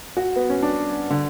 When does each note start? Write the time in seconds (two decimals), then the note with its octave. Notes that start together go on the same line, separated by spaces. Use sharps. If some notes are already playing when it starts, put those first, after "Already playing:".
0.17 F#4
0.36 B3
0.50 C#4
0.63 D4
1.10 D3